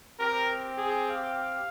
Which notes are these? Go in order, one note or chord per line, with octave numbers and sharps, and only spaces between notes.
C4 G4 A#4
G#4
F5